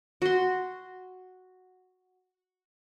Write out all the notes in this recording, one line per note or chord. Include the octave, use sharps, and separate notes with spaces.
F#4 C6